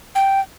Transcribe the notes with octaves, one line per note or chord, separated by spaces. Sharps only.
G5